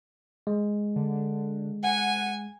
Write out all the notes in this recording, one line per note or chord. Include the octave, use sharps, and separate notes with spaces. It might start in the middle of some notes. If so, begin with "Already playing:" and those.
G#3
D3
F#5 G#5